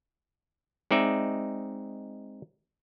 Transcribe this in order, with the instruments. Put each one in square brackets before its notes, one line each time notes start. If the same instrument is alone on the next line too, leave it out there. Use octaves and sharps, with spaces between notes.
[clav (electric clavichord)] G#3 C4 D#4 D5 E5